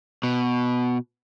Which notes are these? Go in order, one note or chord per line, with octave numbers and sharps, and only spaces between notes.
B2